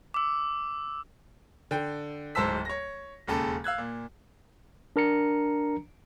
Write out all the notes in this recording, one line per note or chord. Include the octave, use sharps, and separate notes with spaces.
D6 E6
D3 G5
D1 G#2 C5 A5 E6 B6
C#5 A#6
E1 D#2 C#3 A4
F5 E6 F#6 G#6
A#2
D4 A#4 A#5 C#7